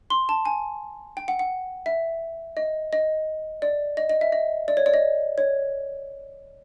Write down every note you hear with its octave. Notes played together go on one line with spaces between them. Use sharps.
C6
A5
G#5
G5
F#5
F#5
E5
D#5
D#5
D5
D#5
D#5
E5
D#5
D5
C#5
D5
D#5
C#5